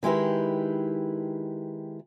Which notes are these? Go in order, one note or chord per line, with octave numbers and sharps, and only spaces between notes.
D#3 G#3 E4 G4 B4